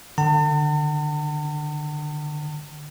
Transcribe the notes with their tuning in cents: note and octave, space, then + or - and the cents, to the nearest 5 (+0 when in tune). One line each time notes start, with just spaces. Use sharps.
D3 +25 F#5 +35 A5 +45